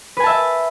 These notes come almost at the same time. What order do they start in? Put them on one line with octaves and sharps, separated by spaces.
B4 G#5 A5 E5